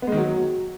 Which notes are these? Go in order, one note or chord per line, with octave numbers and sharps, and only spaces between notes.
B3
G#3
D#3
F#3